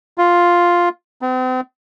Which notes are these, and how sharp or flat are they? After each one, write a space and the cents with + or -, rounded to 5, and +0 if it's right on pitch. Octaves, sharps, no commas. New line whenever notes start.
F4 +0
C4 -40